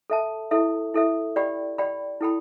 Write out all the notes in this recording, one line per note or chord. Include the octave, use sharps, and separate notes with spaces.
A4 E5 A5
E4 A4 E5
E4 A4 E5
G4 D5 G5 B5
G4 D5 G5 B5
E4 A4 G5 B5